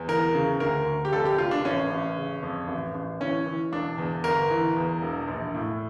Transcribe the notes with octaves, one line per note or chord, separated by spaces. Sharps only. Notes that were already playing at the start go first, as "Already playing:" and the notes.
Already playing: E2
E3 A#4
C#3
D2 A#4
D2
G4
F1 A4
G4
F1 F4
D4
A1 C#4
A1
C#3
F2
A1
A1
E3 C#4
E3
E1 D4
E2
G1 A#4
E3
E2
E1
A#1
A2